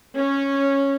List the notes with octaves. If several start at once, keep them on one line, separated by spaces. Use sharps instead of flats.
C#4